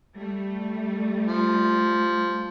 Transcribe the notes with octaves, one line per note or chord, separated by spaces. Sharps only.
G3 A3
F3